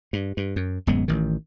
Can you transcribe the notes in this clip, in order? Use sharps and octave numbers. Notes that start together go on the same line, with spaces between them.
G2
G2
F#2
D1 F#2 G#3 B3
A1 D#3